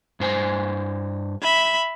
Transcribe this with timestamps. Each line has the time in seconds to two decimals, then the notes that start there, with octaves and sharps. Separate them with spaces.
0.20 G2 C5 G#5
1.42 E5 B5